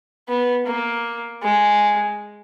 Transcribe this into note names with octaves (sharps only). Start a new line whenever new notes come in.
B3
A#3
G#3